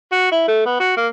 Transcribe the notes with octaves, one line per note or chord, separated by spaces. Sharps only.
F#4
E4
A3
B3
F#4
A#3